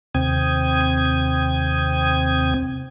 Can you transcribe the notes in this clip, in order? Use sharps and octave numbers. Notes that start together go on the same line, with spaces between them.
D#2 C3 C4 G5 D#6 G#6